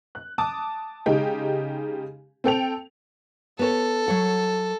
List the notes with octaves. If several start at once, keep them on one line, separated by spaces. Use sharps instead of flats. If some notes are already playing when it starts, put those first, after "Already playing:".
F#6
A5 D6 D#6
C#3 G#3 D#4 G4
C4 A4 G5 F7
B3 A4 C#5
F#3 C#5 F#5